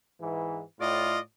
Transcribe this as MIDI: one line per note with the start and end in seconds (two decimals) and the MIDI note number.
0.20 0.61 44
0.20 0.61 52
0.81 1.19 45
0.81 1.19 65
0.81 1.19 74
0.81 1.19 75